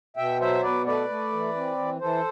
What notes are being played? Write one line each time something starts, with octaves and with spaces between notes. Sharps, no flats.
B2 E5 G5
F#3 C5 E5
B2 B4 D5
A3 B4 D5
A3
E3
C4
E3
E3 A4 C5